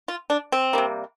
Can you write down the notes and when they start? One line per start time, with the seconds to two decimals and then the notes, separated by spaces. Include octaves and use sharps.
0.08 F4
0.30 D4
0.52 C4
0.73 C3 G3 A#3